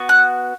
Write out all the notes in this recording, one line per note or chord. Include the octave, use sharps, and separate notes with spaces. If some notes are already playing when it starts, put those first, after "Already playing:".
Already playing: B3 F#4
F#6